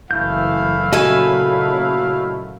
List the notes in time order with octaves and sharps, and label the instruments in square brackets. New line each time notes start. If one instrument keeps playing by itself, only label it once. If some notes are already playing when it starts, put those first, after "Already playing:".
[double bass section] F#1 E3 [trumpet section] A3 E4 F5 [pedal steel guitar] G6
[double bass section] A#2 C#3 F#3 [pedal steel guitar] F#4 D#5 [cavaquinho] A4 B4 G#5